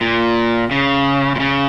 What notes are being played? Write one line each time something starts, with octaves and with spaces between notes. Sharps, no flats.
A#2
C#3
A#2
C#3